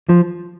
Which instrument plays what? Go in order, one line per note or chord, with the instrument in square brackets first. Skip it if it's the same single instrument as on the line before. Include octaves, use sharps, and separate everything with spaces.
[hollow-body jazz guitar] F3